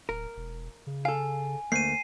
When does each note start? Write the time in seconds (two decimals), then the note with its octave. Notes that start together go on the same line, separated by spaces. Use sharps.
0.09 D1 A#4
0.37 E1
0.87 C#3
1.05 A4 F5 G#5
1.72 D2 A3 A#3 C7 D#7